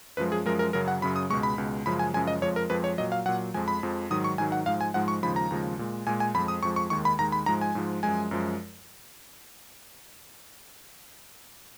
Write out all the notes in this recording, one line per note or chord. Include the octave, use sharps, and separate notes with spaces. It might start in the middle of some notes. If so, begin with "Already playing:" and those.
F#2 F3 G#3 B4
G#4
F#2 F3 G#3 A#4
A#4
F#2 C#3 F#3 A#4
F#5
F#2 C#3 F#3 B5
D#6
C#2 B2 G#3 C#6
B5
C#2 B2 G#3
F#2 C#3 F3 G#3 B5
G#5
F#2 C#3 F3 G#3 G#5
D#5
F2 F3 G#3 C#5
A#4
F2 F3 G#3 B4
C#5
A#2 F#3 D#5
F5
A#2 F#3 F#5
F2 F3 G#3 G#5
B5
F2 F3 G#3
G#2 D#3 F#3 D#6
C#6
G#2 D#3 F#3 G#5
F#5
G#2 F3 G#3 F5
G#5
G#2 F3 G#3 F#5
C#6
D#2 C#3 F3 G#3 B5
A#5
D#2 C#3 F3 G#3
A#2 G#3
A#2 G#3 G#5
G#5
F2 F3 G#3 B5
D#6
F2 F3 G#3 C#6
C#6
D#2 D#3 G#3 C#6
B5
D#2 D#3 G#3 A#5
B5
G#2 F3 G#3 A#5
G#5
G#2 F3 G#3
F#2 F3 G#3 G#5
F#2 F3 G#3